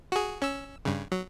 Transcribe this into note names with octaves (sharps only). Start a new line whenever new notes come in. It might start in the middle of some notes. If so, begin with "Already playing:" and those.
F#4 G#4
C#4 E6
G2 C#3
F#3